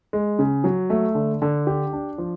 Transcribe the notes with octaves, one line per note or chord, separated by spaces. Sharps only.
G#3
C#3
F#3
A3
D3
D3
G4
D4
F3